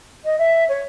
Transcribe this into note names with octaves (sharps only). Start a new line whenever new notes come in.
D#5
E5
C#5